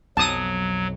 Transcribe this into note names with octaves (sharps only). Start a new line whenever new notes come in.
B1 F2 F#3 A5 D#6